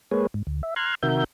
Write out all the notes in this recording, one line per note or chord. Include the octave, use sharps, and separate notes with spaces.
G#3 A#3 G#4 B4 C#5
G#2
D2
E5
A#5 C6 F6 F#6 G#6
C3 D#3 F#4 A#4 E5 G6